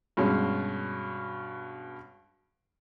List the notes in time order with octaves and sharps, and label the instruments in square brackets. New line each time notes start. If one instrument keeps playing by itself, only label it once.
[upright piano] G2 B2 G#3 C#4